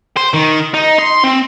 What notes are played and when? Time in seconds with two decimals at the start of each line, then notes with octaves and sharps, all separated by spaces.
0.17 C5
0.34 D#3
0.74 D#4
0.98 C6
1.24 C4